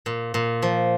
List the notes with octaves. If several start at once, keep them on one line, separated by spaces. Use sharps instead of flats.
A#2
A#2
F3